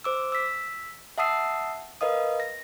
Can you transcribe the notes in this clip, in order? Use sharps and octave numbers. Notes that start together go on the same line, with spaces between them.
C5 D6 E6
E6 B6
E5 F#5 A5 D#6 E6 C7
A#4 B4 D#5 F5 D#6
A#6